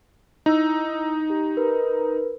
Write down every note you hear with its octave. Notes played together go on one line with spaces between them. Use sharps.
D#4 E4 E6
G4
A#4 B4